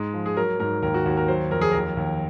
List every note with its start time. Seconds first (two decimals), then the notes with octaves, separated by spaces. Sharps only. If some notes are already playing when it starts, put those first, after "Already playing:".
Already playing: G#2 G#3
0.14 F3
0.26 G#4
0.37 F#3 A#4
0.60 G#2 A#4
0.82 D#2 A#4
0.94 F#4
1.06 D#2 F#4
1.17 A#4
1.28 F#3 C5
1.51 F2 A#4
1.61 G#4
1.71 D#2 A#4
1.97 D#2